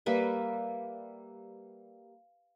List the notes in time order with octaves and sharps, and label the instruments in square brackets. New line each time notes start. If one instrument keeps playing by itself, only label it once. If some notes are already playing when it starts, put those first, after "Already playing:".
[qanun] G3 A#3 B4 E5